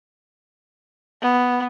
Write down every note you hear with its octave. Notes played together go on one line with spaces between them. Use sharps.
B3